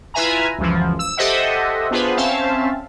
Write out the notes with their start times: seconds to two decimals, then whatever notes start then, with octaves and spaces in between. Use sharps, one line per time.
0.14 E4 F4 B4 E5 G#5 A#5
0.59 C#2 F#2 E3 F3
0.99 E6
1.17 G4 A4 C5 D#5 E5 F#5
1.91 B3 D4 F4 G#4 B4 C5
2.17 C4 C#4 C5 E5 F5 A5